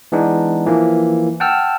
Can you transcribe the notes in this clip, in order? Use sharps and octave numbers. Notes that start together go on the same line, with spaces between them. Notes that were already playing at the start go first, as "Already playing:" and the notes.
E3 G#3 B3 D4 D#4
E3 F3 A#3
F#5 G5 A5 E6 F6